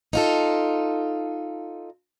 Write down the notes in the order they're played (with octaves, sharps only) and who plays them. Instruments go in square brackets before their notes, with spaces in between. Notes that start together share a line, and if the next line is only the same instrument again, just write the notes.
[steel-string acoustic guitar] D#4 F4 A4